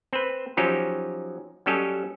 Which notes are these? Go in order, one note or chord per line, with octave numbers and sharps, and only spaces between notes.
C4 B4
F3 F#3 C#4 D#4 G4
F#3 G3 C#4 G4 A4 D#5